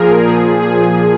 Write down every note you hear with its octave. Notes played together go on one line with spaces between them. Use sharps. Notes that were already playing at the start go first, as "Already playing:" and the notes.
Already playing: A#2 F3 G#4 A#4
A#2 F3 G#4
G#4